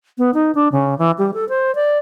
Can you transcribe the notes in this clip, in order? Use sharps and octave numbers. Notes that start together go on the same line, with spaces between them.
B3
D#4
D4
C#3
E3
G3
A4
C5
D5